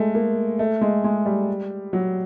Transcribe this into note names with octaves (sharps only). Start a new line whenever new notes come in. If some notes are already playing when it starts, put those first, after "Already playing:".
Already playing: G#3 A3
A#3
A3
G#3
G#3
G3
F#3